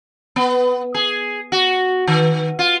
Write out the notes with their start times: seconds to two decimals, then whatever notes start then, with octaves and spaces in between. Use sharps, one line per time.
0.36 B3
0.94 G#4
1.52 F#4
2.08 D#3
2.59 F4